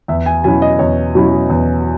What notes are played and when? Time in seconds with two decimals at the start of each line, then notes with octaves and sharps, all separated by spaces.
0.08 E2 E5
0.26 G#5
0.44 B2 F#3 C#4 E4 G#5
0.62 D#5
0.79 E2 C#5
1.15 B2 F#3 C#4 E4
1.50 E2